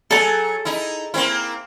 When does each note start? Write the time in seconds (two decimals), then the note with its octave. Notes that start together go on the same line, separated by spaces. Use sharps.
0.11 F#3 G#4 A4 A5
0.65 D#4 E4
1.14 A#3 C4 E4